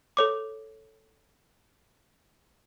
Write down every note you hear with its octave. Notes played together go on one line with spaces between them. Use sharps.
A4 C#5 D6